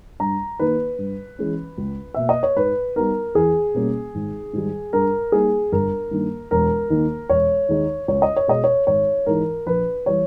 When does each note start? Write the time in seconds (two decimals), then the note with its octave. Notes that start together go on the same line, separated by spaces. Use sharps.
0.20 G2 A#5
0.59 D#3 A#3 D#4 B4
0.99 G2
1.39 E3 G#3 C#4
1.78 C#2
2.14 B2 A#3 E5
2.29 D#5
2.43 C#5
2.56 G#2 B4
2.96 G3 B3 D#4 A#4
3.35 E2 G#4
3.74 B2 G3 A#3 C#4
4.15 G#1
4.53 G#2 D#3 G3
4.93 G2 A#4
5.32 G3 A#3 D#4 G#4
5.72 G1 A#4
6.11 G2 D#3 A#3
6.51 E1 A#4
6.90 D#2 D#3 A#3 D#4
7.29 E1 C#5
7.69 D#2 D#3 G#3 D#4
8.08 C#2 C#5
8.22 D#5
8.36 C#5
8.48 B2 G#3 D#5
8.64 C#5
8.87 G#1 C#5
9.26 G#2 E3 G#3 D#4 A#4
9.66 A#1 B4
10.06 E3 G3 C#5